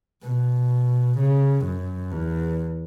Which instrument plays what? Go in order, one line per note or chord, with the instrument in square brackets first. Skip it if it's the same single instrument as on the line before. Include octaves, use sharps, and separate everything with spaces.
[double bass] B2
C#3
F#2
E2